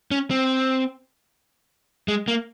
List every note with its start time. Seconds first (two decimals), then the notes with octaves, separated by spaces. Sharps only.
0.11 C#4
0.31 C4
2.08 G#3
2.28 A#3